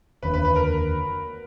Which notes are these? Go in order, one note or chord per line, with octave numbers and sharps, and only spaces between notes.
F1 D#2 D3 B4
B4
B4
A#4